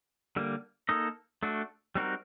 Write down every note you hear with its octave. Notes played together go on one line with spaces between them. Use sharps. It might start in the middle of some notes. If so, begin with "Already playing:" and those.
D3 G3 A#3
A#3 D#4 A4 D#5
A3 D4 F#4
G3 C4 D#4 F#4 A#4